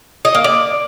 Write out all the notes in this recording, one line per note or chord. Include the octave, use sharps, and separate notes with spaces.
D#5
A#3
D5